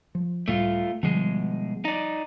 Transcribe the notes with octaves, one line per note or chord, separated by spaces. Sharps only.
F3
C#2 A2 G3 A3 F4
B2 D3 F3 G3 G#3
D#4 D5